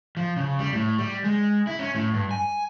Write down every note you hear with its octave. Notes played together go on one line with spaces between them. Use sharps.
F3
C#3
G3
A2
G3
G#3
E4
C#4
A2
G2
G#5